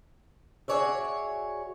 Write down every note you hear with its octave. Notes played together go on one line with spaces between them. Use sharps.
F#4 G#4 C#5 D5 E5